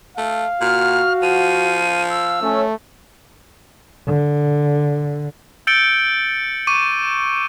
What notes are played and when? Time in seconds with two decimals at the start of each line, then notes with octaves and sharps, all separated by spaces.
0.18 A3 F5
0.61 A#2 F#4 F6
1.22 F3 D#7
2.10 E6
2.42 A3 C#4
4.07 D3
5.67 E6 G6 A6 C#7 D7 G7
6.67 C#6 D6 D#7